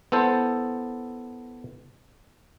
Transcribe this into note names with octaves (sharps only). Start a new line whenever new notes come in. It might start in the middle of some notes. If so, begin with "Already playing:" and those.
B3 E4 A4 C5